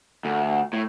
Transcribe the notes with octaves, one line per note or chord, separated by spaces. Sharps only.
D2
A2